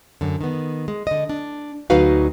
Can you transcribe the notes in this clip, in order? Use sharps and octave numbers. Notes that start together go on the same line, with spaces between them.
F#2 D3
D#3 B3
G#3
D3 D#5
D4
D2 F#3 D#4 F#4 B4 F5